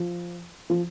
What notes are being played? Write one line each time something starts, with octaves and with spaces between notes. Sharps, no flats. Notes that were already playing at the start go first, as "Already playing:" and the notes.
Already playing: F3
F3